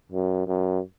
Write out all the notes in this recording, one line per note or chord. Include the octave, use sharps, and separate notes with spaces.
F#2
F#2